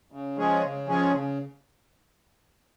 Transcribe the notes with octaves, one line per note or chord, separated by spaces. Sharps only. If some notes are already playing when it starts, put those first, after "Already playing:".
C#3
F3 G#3 C#4 G#4
C#3
F3 G#3 C#4 G#4
C#3